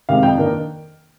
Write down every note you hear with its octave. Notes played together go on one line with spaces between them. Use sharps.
C3 D#3 G#3 C4 F5
F2 G5
D#3 A#3 D4